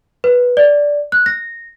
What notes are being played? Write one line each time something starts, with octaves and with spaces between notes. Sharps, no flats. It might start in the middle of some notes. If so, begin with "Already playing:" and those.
B4
D5
F#6
A#6